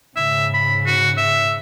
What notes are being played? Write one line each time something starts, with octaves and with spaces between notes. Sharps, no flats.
G#2 C#3 E5
B5
F#4
E5